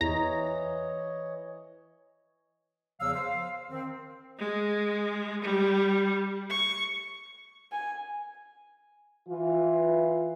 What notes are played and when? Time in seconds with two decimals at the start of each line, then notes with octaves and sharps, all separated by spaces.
0.01 E2 E3 C#5 D#5 A#5
3.00 E2 C#3 F3 F#3 F5 E6
3.16 C5 F5
3.70 D#3 C4
4.38 G#3
5.42 G3
6.50 C#6
7.72 G#5
9.29 E3 F4